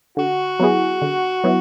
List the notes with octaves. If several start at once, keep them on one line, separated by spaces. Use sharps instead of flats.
D3 F#4
F#3 B3 E4 G#4
D3
F#3 B3 E4